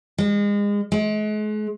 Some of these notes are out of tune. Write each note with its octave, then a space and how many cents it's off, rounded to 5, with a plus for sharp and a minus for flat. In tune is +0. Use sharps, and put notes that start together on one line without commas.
G#3 -30
G#3 +40